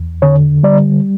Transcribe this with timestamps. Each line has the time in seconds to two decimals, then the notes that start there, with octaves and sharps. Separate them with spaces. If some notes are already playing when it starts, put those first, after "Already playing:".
Already playing: E2
0.22 D3 C#5
0.63 G3 D5